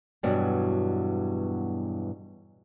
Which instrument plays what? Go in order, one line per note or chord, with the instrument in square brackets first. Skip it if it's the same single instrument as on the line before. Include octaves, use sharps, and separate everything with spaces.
[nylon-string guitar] E2 G2 B2 F#3